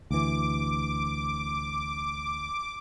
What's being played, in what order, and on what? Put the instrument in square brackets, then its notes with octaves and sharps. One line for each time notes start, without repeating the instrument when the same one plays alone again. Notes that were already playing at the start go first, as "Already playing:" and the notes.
[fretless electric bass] D2 E3 [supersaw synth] D6